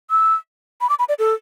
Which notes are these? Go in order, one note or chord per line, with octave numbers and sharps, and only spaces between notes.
E6
B5
D6
B5
D5
A4